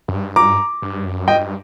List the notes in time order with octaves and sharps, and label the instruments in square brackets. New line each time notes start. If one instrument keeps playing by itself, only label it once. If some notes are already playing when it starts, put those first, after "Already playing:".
[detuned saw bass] F#2
G2
[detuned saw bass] G2 [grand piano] A#5 D6
[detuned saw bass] G2
F#2
[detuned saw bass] G2 [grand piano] D#5 G5